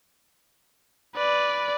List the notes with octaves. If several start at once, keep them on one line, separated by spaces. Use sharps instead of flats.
B4 D5